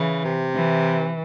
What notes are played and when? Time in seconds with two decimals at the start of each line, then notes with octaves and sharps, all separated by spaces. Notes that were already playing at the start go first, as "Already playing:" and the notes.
Already playing: C#3 E3
0.25 C3
0.55 E3